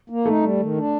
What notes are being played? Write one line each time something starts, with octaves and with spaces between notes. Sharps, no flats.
A#3
A3 D#4
G3
D#3
D4